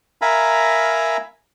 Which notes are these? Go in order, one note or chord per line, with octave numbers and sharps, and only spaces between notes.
A#4 E5 F5 G#5 A#5 B5